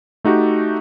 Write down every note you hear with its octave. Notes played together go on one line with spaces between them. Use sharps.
A3 D#4 F#4 G4